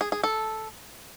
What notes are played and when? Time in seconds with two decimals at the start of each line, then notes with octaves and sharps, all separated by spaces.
0.01 G#4
0.12 G#4
0.23 A4